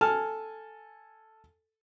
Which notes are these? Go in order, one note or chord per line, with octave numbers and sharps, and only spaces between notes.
A4 G#5 A5 F6